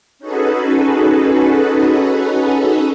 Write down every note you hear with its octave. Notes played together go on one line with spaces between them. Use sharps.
C#4 D#4 F#4 G#4 A4 B4